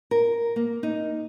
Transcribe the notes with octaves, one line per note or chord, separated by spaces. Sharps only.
A#4
A#3
D#4